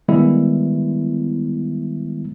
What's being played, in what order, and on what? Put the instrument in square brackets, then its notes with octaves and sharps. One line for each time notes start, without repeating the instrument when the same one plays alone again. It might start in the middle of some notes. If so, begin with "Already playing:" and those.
[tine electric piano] D#3 G3 G#3 B3 E4